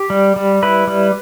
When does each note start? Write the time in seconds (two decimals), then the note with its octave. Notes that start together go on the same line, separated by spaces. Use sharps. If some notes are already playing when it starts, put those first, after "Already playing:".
Already playing: G4
0.10 G3
0.36 G3
0.63 E4 B4
0.87 G3